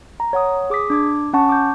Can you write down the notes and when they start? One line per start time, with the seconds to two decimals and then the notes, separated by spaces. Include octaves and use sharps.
0.20 A#5
0.33 C#5 F#5 D#6
0.70 G#4 D6 D#6 B6
0.90 D4 D6 G#6
1.33 C#4 F#5 A5 C#6
1.49 D6 G6